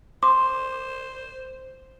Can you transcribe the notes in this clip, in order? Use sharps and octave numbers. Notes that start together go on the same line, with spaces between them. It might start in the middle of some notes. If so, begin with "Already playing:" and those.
C5 C6 D6